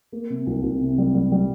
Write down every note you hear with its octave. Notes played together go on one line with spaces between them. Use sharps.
A#3
C3
C2
C2
C3
G3
G3
G3